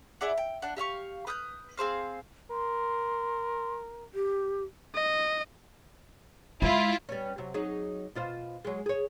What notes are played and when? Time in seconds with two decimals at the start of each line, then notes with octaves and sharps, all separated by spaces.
0.21 E4 G#4 D5 F#5
0.38 G5
0.62 D4 F#5
0.77 G4 E5 F5 C#6
1.27 B4 D#6 F6 G6
1.77 C4 G#4 C5 F5
2.51 A#4 C6
4.14 G4
4.95 D#5
6.62 G#3 E4 F4
7.09 G3 B3 C#4
7.38 C3 F#3
7.54 F#3 D#4 G#4
8.15 B2 F4 C5
8.65 F#3 G#3
8.86 G#4 C#5